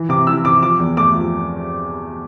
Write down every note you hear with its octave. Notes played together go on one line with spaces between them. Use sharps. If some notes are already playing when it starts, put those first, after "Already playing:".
Already playing: E3
C3 D6
E3 E6
C3 D6
F3 D6
E2
A3 D6
F3